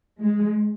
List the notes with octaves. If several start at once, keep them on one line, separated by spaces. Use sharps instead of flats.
G#3